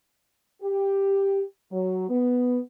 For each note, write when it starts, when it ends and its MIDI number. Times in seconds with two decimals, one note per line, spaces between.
0.62 1.43 67
1.72 2.06 54
2.09 2.60 59